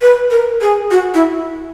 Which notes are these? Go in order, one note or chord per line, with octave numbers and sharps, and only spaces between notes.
B4
A#4
G#4
F#4
E4